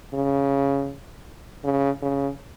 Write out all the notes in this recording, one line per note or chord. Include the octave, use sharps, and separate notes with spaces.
C#3
C#3
C#3